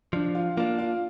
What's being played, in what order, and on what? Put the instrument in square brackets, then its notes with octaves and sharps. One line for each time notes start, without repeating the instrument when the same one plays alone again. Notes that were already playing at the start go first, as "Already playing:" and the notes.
[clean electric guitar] F3 [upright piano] D4
[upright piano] F4
[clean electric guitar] A#3 D4 [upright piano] F4
[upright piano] F4